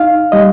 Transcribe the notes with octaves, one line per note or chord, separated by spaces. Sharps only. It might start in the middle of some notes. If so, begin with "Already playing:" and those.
Already playing: D#4 F5
G3 D#5